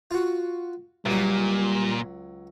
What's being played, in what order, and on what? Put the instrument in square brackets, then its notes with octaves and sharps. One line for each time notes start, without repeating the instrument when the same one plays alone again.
[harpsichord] F4 F#4
[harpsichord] C#2 F#3 [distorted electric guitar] A#2 [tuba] G3